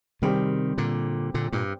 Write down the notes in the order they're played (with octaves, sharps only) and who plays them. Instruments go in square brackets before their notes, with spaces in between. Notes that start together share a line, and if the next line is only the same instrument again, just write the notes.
[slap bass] C3 D#3 [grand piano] G3 C4 G4
[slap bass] A#2 D3
A#2 D3
G2 A#2